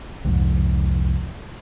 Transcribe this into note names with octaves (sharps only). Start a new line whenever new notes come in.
C2 F2 G#2